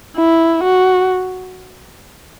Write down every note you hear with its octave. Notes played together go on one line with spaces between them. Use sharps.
E4
F#4